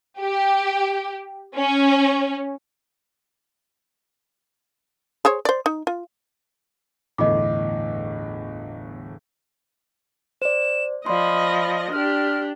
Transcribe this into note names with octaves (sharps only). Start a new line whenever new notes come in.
G4
C#4
G#4 C5 C#5
C5 D5
D#4
F4
G1 E2 A2 D#5 D6
C5 D5 E7
F3 D5 D#5 B5 C6
D4 G4 F6